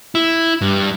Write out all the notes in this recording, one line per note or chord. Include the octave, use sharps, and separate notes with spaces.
E4
G2